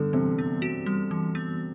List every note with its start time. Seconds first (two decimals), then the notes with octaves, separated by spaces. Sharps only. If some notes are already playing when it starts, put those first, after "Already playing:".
Already playing: D3 G3
0.13 C3 E3
0.39 B3
0.62 F#4
0.86 G3
1.11 E3
1.35 B3